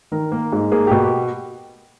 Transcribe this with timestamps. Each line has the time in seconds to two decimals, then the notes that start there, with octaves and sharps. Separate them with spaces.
0.12 D#3 A#4
0.32 A#3
0.52 G#2
0.72 A#3 G#4
0.87 B2 G4
1.02 G4